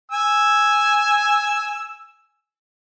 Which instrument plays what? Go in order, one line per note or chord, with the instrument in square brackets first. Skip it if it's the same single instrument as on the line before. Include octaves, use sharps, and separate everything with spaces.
[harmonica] G#5 E6